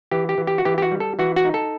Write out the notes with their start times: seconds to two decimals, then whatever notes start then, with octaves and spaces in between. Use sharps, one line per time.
0.11 E3 G4
0.29 G4
0.38 E3
0.47 G4
0.58 F#4
0.65 E3 G4
0.78 G4
0.82 F#4
0.91 G3
1.00 A4
1.19 E3 F#4
1.36 F#4
1.45 D#4
1.54 A4